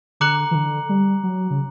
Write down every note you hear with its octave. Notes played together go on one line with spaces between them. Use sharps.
D3 A#5 D6 F#6 C#7 F#7
E3
D3
G3
F#3
C#3